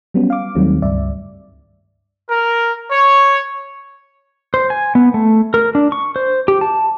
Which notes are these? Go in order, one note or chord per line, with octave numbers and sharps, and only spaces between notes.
F#3 G3 B3 C#4
F5 D6
D#2 D#3 F#3 G3 A3 C4
C#2 G2 D5 E5
A#4
C#5
C5
G#5
B3
A3
A#4
D4
C#6
C5
G4
A5